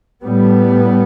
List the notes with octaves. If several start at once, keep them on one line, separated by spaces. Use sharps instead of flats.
A2 G3 B3